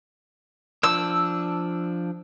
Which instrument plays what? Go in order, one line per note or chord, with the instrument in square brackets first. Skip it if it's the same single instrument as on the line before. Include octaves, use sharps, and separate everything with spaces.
[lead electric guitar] F3 D4 [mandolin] E6